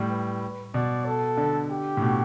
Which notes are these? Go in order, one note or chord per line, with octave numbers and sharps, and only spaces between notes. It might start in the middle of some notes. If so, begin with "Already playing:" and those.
Already playing: A2 G3
B4
B2 D5
A4
D3
G4
A2
B2